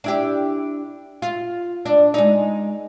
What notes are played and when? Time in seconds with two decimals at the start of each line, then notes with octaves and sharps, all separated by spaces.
0.04 D4 E4 G4
1.22 F4
1.86 D4
2.14 G#3 D#4